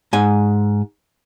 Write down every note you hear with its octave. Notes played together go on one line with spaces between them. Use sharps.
G#2 G#5